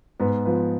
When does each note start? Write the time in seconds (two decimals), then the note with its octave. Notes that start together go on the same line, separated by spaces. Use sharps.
0.20 G#2 B3 B4
0.45 F3 B3 B4